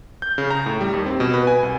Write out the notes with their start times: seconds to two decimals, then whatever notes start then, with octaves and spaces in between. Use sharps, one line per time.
0.22 G6
0.38 C#3
0.50 A#5
0.66 A2
0.81 G3
0.93 D#2
1.06 C4
1.20 B2
1.33 B4
1.47 G#5
1.63 C2